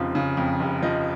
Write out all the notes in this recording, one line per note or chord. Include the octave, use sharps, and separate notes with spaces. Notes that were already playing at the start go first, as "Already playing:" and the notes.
Already playing: F1 F2 C#3 F3
C#3
F2
F1
F3 D#5